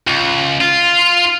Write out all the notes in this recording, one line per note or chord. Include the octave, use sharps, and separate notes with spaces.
C#2
F4